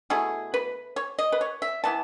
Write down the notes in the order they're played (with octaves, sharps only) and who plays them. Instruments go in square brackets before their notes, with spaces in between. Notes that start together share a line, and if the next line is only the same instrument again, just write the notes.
[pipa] B2 A3 E4 G#4
B4
C#5
D#5
B4
C#5
E5
E3 B3 E4 A5